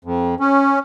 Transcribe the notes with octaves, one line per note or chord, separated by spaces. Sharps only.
F2
C#4